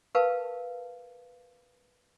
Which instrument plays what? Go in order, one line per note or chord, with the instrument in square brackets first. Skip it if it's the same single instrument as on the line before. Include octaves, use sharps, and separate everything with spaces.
[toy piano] A#4 B4 F5 A5